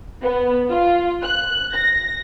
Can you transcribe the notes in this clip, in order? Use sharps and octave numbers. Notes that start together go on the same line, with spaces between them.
B3
F4
F#6
A#6